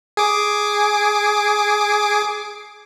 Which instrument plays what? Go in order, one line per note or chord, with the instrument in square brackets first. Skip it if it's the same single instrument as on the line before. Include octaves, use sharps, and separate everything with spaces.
[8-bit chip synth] G#4 D6